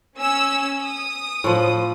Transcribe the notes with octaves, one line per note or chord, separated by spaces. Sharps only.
C#4 E6
D#6
A2 F3